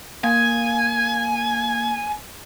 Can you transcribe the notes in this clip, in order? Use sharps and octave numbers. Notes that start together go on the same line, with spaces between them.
A#3 G#5